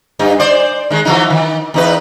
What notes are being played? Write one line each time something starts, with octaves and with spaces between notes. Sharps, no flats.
G2 D#4
C5 D5
D#3 G#3
E3 F3 D#4
D#3
E2 D#4 B4